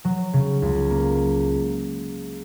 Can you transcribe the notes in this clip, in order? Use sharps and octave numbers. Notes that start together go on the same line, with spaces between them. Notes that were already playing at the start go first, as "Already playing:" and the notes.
F#3
C#3
C#2
A#3